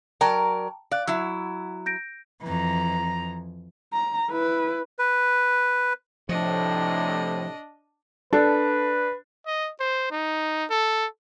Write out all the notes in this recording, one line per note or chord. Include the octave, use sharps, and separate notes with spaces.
F#3 A#4 D5 G5 A5 A#5
D5 F5 F#6
F#3 E4 E6
G6 A#6 D7
F2 E3 A#5
A#5
E4 B4
B4
A2 C3 F3 D4 D#5
D4 A4 B4
D#5
C5
D#4
A4